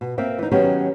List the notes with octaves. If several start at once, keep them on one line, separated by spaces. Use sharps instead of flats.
B2
A#3 C4 E5
E3 D#4
D#3 F#3 B3 C#4 G4